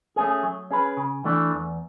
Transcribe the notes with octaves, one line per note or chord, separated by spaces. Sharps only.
A3 C#4 G#4
F#3
C#4 G#4 B4
C#3
E3 A3 D4
E2